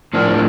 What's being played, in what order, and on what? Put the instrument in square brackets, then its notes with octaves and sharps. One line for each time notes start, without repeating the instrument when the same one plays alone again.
[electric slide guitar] A2 F3 A#3 D4